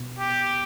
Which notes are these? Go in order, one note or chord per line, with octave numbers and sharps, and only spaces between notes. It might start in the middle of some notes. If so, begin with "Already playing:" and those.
Already playing: B2
G4